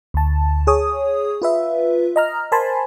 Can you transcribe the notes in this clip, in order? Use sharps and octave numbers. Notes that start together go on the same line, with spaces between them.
D2 A5
G#4 C#5 D#6
F4 B4 E5
D#5 A#5 F6
A#4 C5 G#5 A5 B5 C6